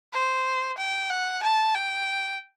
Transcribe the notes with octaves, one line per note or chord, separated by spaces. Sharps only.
C5
G5
F#5
A5
G5